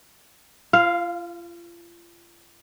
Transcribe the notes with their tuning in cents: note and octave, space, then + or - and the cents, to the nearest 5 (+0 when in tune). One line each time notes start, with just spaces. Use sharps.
F4 -35 F5 +0